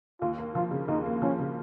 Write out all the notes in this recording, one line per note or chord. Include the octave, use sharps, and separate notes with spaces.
D#2 F4
A#3
F3 F4
C#3
D#2 D#4
A#3
F3 C#4
C#3